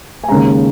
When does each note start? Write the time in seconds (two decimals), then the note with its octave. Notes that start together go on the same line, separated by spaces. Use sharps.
0.24 G#5
0.28 D#2 C#3 G#3 A#5